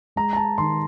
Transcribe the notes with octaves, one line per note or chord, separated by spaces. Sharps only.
G#3 A#5
A#5
A5
D#3 C6